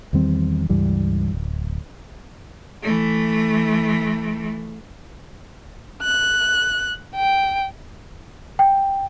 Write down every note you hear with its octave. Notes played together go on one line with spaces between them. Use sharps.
E2 D#3 G3 C4
C#2 G2 E3 G3
D1
E3 A3
F#6
G5
G5